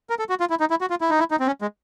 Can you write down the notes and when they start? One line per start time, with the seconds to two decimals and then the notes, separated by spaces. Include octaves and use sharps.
0.10 A#4
0.19 A4
0.30 F#4
0.40 F4
0.50 E4
0.60 D#4
0.70 E4
0.81 F#4
0.90 F4
1.01 E4
1.10 D#4
1.19 E4
1.31 D#4
1.40 C4
1.47 C#4
1.62 G#3